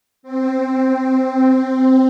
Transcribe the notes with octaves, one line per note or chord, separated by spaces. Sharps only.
C4